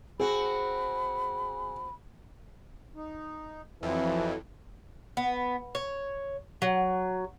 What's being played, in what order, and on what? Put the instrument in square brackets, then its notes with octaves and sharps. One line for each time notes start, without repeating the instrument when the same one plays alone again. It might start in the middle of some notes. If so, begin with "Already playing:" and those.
[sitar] C4 F#4 [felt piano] G#4 [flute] B5
[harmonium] D#4
[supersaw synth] F2 [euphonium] E3 [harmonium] F#3 E4 A4
[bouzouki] B3
C#5
F#3